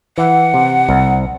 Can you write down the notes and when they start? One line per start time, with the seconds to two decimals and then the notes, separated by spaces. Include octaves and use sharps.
0.18 E3 F#5
0.54 C3
0.89 C2